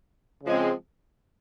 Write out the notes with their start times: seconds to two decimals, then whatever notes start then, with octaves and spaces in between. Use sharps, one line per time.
0.44 C#3 F3 G#3 C4